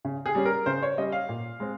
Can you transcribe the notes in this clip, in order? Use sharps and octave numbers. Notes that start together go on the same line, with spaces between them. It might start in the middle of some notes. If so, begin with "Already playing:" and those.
C#3
G#4
G3 C#4
A#4
C#3 C5
C#5
G3 C#4 D#5
F5
A#2
G#3 C4